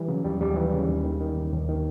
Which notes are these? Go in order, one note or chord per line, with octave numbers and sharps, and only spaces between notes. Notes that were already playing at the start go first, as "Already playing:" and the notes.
Already playing: E3 G3
C#3 F#3
D#2 G3
D#2 G3
E3
C#3
D#2
D#3
D#3
D#2
D#2
D#3